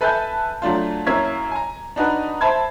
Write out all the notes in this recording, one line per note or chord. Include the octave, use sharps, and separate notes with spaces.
A4 B4 E5 G#5 A5 G6
F#3 A3 D4 F4
F#2 A#3 E4 C#5 G#6 B6
G#5 A#5
D4 D#4 F#4 B4
C5 E5 A5 B5 G#6